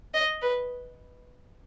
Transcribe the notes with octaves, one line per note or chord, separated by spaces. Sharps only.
D#5
B4